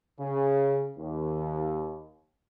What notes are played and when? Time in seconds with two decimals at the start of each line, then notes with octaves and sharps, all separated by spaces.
0.19 C#3
0.97 D#2